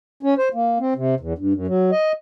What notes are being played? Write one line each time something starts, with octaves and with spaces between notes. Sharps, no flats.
C#4
C5
A#3
C4
C3
E2
G2
F#2
F#3
D#5